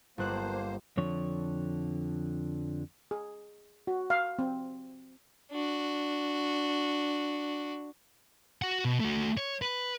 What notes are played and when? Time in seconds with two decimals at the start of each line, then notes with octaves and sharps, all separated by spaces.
0.18 G1 A#3 C5 F#6
0.97 F2 D3 F3 C#5
3.11 G#4
3.87 F#4
4.10 F5
4.39 C4
5.52 D4 F#4
8.62 F#4 F#5
8.85 B2
9.00 A3 F#4
9.37 C#5
9.62 B4